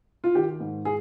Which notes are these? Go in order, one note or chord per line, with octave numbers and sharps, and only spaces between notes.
F4
D#3 G4
G#2
G#4